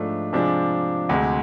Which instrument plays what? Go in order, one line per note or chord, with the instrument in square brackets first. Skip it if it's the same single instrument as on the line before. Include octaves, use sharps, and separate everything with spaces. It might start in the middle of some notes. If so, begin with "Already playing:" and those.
Already playing: [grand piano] G#2 F3 A3 D4
C3 F3 G#3 D4
D2 C3 G#3